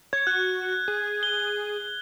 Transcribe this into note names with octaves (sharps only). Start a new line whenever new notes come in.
C#5 G#6
F#4 F#6
G#4
G7